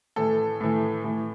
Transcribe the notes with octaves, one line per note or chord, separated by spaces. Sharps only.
A2 E3 A4
A2 E3
A2 E3